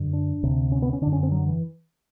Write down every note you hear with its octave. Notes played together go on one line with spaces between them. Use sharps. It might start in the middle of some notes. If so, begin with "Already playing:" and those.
Already playing: F#2 D3
D4
D2 C3
C#4
B3
C#4
D3 D4
F#2
C#4
C4
F#3
E3